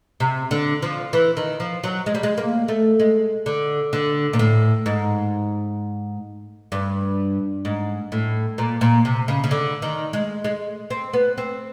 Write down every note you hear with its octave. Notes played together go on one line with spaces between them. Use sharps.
C3
D3
F3
E3
D#3
F3
F#3
G#3
G3
G#3
A#3
A3
G#3
D3
D3
A#2
A2
G#2
G2
G#2
A2
A#2
A#2
C3
C#3
C#3
D3
D#3
G#3
G#3
C4
B3
C4